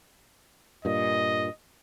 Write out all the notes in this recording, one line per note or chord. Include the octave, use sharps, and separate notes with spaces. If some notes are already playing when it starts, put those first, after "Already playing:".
G2 A#2 D#5